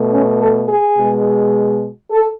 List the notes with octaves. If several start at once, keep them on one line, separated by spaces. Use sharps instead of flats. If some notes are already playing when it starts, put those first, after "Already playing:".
Already playing: B2 A3
C#4
A4
G#4
B2 G#3
A4